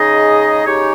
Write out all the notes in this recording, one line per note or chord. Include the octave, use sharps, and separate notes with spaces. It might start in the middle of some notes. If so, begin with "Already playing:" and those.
Already playing: C#3 G#3 D#4 G#4 D#5
C#3 G#3 D#4 G4 C#5